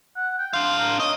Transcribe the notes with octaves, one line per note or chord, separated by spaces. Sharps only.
F#5
G5
D4 F5 C6
A#4
C#5 D#5